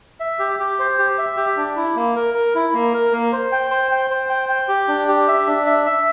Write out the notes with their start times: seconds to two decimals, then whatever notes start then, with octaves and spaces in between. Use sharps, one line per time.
0.20 E5
0.39 G4
0.60 G4
0.79 C5
0.98 G4
1.18 E5
1.37 G4
1.57 D4
1.76 E4
1.96 A#3
2.16 A#4
2.34 A#4
2.55 E4
2.74 A#3
2.94 A#4
3.12 A#3
3.33 C5
3.52 G5
3.71 C5
3.91 G5
4.10 C5
4.29 G5
4.49 G5
4.68 G4
4.88 D4
5.08 G4
5.28 E5
5.47 D4
5.67 E5
5.86 E5